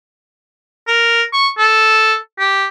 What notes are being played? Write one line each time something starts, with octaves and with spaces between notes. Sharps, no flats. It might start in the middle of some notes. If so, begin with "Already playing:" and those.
A#4
C#6
A4
G4